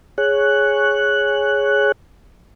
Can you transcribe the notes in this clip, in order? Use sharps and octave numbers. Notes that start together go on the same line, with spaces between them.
G#4 C#5 F#6